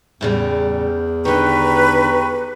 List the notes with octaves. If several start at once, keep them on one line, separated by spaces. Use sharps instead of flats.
E2 A2 C#3 G3
D3 D#3 G4 B4 A#5 C#6